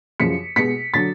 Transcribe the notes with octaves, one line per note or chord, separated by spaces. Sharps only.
F#2 C#3 F3 B6 C#7
B2 G#3 B6 C#7
D3 F#3 A6 B6